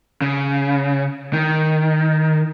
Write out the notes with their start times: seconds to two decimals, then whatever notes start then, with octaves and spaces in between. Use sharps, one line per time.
0.22 C#3
1.33 D#3